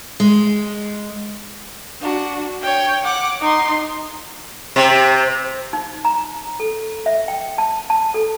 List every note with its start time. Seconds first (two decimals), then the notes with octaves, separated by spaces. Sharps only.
0.20 G#3
2.01 D4 F#4
2.62 C#5 G5
3.05 F#5 D6
3.41 D#4 C6
4.76 C3
5.73 D#4
6.05 A#5
6.60 A4
7.06 E5
7.28 G5
7.58 A5
7.90 A5
8.14 A4